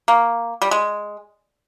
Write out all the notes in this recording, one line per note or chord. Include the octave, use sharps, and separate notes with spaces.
A#3
G3
G#3